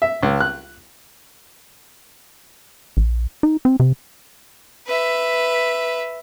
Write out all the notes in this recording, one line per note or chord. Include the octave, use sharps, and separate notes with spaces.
E5
C#2
F#6
A#1
D#4
C4
C3
B4 E5